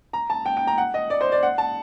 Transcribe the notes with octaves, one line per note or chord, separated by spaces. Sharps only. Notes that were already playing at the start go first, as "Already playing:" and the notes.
A#5
A5
G5
G5
A#5
F#5
D#5
D5
C5
D5
F#5
A5